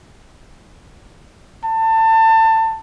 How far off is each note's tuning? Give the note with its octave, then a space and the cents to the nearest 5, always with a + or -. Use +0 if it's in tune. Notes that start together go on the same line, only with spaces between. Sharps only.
A5 +25